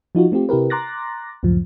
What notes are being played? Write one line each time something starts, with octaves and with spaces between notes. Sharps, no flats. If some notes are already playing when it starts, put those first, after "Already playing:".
F3 D#4 F4 F#4
A3 C4 F4 G4
C3 E4 G4 A#4 B4
A#5 C6 D6 F#6 A6 A#6
C#2 F#2 A2 F3